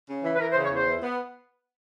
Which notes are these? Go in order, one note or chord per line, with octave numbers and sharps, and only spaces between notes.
C#3
E3
B4
E3 A#4
C5
C#3
C#5
E2 C5
E3
B3